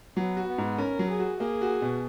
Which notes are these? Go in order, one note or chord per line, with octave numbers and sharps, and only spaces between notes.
F#3 B3
F#4
B3
G#2
C#4 A#4
F#3
G#4
F#4
A#3 G#4
F#4
B2